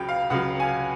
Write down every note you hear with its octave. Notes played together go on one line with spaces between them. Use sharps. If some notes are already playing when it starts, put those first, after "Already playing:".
Already playing: C#2 C#3 F#3 G5
F5
C#2 C#3 F#3 F#5
G#5